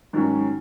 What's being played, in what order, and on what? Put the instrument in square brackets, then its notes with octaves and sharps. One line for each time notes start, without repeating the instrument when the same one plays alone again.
[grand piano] G#2 D#3 F#3 C#4